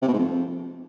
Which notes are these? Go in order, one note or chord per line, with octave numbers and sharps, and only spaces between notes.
C3
B2
G#2
F2